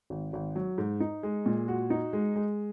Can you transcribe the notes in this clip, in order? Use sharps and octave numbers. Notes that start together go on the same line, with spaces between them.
G#1
G#1
F#3
G#2
D#4
G#3
A#2
F#4
D#4
G#3
G#3